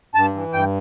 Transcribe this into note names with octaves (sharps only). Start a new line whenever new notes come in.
G2 A5
E3
G2 G5